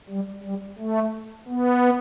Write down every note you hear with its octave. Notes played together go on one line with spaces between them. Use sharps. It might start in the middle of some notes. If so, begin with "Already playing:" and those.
G3
G3
A3
B3